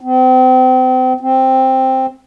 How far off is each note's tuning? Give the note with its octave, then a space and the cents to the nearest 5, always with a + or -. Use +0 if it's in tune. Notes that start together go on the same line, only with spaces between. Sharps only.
C4 -35
C4 +5